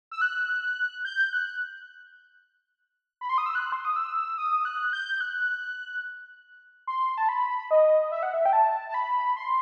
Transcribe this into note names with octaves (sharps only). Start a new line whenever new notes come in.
E6
F#6
G6
F#6
B5
C6
D#6
E6
F#6
C6
D#6
E6
D#6
F#6
G6
F#6
C6
A5
B5
D#5
E5
F#5
E5
G5
A5
A5
B5
C6